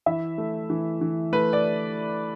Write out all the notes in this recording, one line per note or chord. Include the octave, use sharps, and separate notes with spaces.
E3 E4 E5
A3
E3
E3
A3 B4
D5